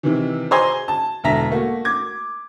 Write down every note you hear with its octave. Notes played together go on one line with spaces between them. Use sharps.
C3 D#3 E3
G#4 C5 G#5 A#5 C6 G#6
A5
E1 D3 A4 E5 A#5 B6
A3 A#3 F#4
D6 G#6